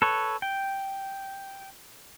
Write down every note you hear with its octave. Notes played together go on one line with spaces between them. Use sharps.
A4 B4 C#5
G5